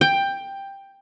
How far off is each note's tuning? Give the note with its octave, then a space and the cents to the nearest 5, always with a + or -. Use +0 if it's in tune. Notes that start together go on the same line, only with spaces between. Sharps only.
G5 +10